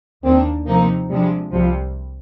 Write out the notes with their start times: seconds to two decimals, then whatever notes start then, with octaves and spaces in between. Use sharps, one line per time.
0.23 D#2 D#3 A#3 C4 D4
0.66 C3 F3 A#3 C4 D#4
1.09 C3 F3 G3 G#3 D4
1.52 C2 C3 F3 G3